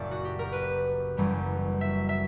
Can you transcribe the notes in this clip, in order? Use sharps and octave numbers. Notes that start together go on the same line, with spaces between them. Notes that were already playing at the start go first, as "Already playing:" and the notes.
Already playing: F#1 F#2 A#2 C#3 D5 E5
F#4
G4
A#4
B4
F#1 F#2 E3 G3
E5
E5